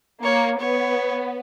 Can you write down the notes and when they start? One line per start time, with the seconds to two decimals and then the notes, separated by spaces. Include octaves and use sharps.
0.23 A#3 C#5
0.60 B3 C#5